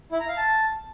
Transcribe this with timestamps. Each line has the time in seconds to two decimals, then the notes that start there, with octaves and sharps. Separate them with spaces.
0.12 E4
0.20 A#5
0.28 F5
0.37 A5